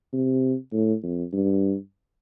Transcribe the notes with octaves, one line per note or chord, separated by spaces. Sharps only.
C3
A2
F2
G2